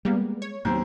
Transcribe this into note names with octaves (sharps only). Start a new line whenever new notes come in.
G3 G#3 A#3 B3
C#5
D#2 A2 F#3 B3 C4